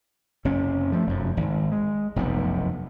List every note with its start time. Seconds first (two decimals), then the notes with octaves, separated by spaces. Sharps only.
0.45 F#1 C3 C#4
0.92 F3 A3
1.07 F1 F#2
1.37 G#1
1.72 G#3
2.16 F1 B1 F#2 B2